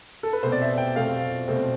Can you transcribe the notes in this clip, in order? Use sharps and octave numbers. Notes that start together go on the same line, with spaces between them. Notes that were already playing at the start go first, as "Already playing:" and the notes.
A4
B4
B2 A3 C4 C5
D5
E5
G5
B2 A3 C4 F5
B2 A3 C4